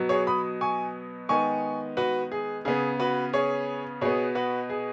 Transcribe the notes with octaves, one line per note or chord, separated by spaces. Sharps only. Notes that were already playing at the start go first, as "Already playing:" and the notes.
Already playing: B2 F#3 B3
G#4 C#5
B5 D#6
G#5 C#6
D#3 G#3 B3 G#5 C#6
F#4 B4
G#4
C#3 B3 G#4
F#4 B4
G#4 C#5
B2 B3 G#4 C#5
F#4 B4
G#4